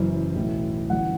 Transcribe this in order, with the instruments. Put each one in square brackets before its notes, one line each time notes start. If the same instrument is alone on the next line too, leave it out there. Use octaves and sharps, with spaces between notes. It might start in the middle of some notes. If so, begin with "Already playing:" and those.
Already playing: [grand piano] F#1 F#2 E3 C5
B1 A2 E3
G1 F#2 E3 F#5